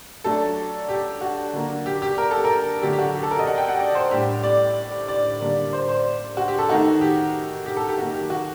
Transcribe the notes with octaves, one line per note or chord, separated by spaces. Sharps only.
F#3 A3 D4 A4
G4
F#4
D3 F#3 A#3 D4
G4
G4
A#4
A4
A#4
D3 F#3 A3 D4 G4
G4
F#4
G4
A4
A#4
D#5
F#5
G5
F#5
D5
C5
A2 G3 D4 G4
D5
D5
D3 G3 A#3 D4
C5
C5
F#4
G4
A4
D#3 A3 D#4 F#4
G4
G4
A4
G4
D#3 F#3 A#3 F#4
G4
F#4